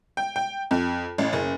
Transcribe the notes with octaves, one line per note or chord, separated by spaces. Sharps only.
G5
G5
F2
A1
F#1